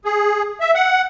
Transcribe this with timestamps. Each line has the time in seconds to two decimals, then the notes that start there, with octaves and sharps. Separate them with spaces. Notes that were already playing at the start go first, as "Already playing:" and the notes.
0.05 G#4
0.61 E5
0.75 F#5